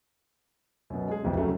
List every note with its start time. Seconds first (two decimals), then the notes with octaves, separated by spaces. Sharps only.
0.90 F#2 B2
1.08 G#3 G#4
1.24 D1 B1 F2 C3 C4 E4
1.37 F#2 C#3 F#3 A3